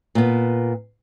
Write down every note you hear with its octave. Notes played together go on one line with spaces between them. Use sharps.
A#2 B3